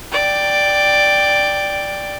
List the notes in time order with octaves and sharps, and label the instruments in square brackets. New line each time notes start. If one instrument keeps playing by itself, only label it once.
[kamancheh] D5 G5